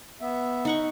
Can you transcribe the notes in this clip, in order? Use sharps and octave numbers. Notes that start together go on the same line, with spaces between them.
B3 E5
D#4 F#5 C#6